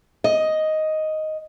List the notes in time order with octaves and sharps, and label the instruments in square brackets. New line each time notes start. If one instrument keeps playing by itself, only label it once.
[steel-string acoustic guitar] D#5